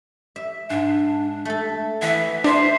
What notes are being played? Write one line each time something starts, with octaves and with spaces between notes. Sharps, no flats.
E5
G#2 D4
A3 A4
E3 B3 E5
D4 C5 E5